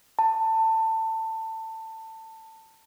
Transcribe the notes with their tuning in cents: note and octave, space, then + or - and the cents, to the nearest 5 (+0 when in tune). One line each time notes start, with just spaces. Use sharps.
A5 +20